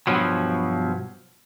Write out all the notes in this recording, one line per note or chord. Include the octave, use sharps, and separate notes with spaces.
G2 B2 F3 F#3